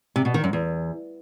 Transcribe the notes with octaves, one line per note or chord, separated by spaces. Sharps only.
C3
B2
D#3
F#2
E2